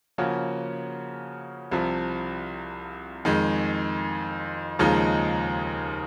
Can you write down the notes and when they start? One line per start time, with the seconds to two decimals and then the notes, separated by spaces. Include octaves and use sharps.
0.18 C#3 F3 A#3 C#4 F#4
1.72 C2 C3 F3
3.25 F2 D#3 G#3
4.79 D#2 C#3 F3 G#3 D#4